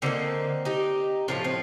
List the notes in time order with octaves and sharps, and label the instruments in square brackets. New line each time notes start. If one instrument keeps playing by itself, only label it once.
[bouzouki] D3 G3 A#3 C4 D#4
D#4 G4
A2 F3 A3 D4 F4
C4